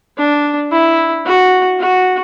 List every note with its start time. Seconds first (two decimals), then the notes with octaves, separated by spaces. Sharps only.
0.17 D4
0.72 E4
1.26 F#4
1.80 F#4